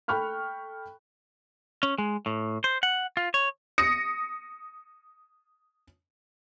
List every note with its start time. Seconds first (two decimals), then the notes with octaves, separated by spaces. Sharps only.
0.08 A4 G5 B5 C#6 F6 F#6
1.83 C#4
1.98 G#3
2.26 A2
2.64 C5
2.83 F#5
3.17 F4
3.34 C#5
3.78 D#6 A#6 C#7